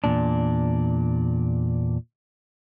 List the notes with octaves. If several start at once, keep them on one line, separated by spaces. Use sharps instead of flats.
E2 A#2 D4